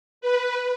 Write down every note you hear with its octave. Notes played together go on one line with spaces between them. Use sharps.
B4